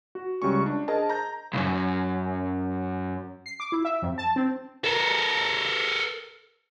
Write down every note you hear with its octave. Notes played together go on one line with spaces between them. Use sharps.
F#4
C#2 G3 C#4 C#6
D4
G#4 A#4 C5 D#5 A5
A#5 G6
B1 F#2
C7
D6
E4
E5
F2
A5
C4
A4 A#4